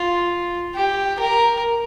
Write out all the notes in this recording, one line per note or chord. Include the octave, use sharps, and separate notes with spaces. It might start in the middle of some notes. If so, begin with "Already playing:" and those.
Already playing: F4
G4
A#4